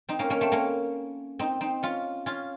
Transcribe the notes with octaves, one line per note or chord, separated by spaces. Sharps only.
C4 D#4
A#3 C#4
A#3 C#4
A3 C4
A#3 C#4
C4 D#4
C4 D#4
C#4 F4
C#4 F4